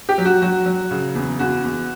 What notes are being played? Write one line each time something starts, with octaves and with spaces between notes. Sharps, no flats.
G4
F#3
F#4
F#3 F#4
F#3
C#3
E2
E2 F#4
E2